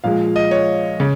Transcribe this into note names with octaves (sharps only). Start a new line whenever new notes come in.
A#2 F3 G#3 F5
D#5
C#5
C#3